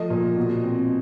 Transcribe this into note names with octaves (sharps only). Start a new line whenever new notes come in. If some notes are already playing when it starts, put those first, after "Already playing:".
Already playing: F3 A3 D#5
A#2
B2
C4